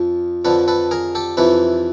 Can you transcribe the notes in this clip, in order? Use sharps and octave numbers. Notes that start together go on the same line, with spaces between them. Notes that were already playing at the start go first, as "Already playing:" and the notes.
Already playing: F2 F3
F2 D3 F3 A4 B4
A4 B4
G#4 A#4
G4 A4
F2 C3 E3 A4 B4